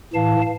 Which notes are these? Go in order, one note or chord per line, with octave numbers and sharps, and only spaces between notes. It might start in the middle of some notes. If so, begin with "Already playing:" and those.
A2 E3 F5 A5